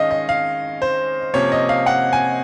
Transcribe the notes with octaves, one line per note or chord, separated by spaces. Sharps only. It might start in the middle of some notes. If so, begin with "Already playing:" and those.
Already playing: D#3 G#3 C#4 D#5 F5
D#5
F5
C5
C3 F3 A#3 C#4 C#5
D#5
F5
F#5
G#5